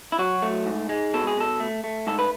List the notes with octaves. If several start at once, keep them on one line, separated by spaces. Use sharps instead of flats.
E4
F#3 F#4
A3
G#2
G#3
B2 A4
G#4
B2 A4
A3
A3
G#2 A4
B4